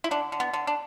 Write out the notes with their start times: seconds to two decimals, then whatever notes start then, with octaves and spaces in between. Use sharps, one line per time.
0.04 E4
0.11 D3 D4
0.32 D3
0.40 B3
0.53 D3
0.67 D4